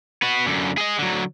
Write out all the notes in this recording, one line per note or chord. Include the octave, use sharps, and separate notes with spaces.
B3 F#4
F#2 D3
G#4 D#5
D3 F#3